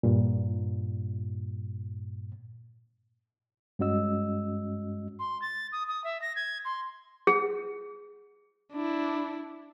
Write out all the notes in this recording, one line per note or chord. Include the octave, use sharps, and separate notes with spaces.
G2 A#2
G2 G#3 C#4 F#4 D#5 E6
C6
A6
D#6
D#6
E5
A#6
G#6
C6
G#4
D4 E4